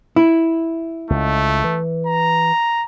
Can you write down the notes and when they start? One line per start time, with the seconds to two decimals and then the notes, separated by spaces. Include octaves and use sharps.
0.16 E4
1.10 C#2 A3
1.64 E3
2.07 A#5